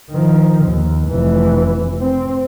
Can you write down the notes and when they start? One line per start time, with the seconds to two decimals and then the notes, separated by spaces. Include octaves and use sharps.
0.11 D#3 F3
0.64 D#2
1.09 F1 E3
2.01 C4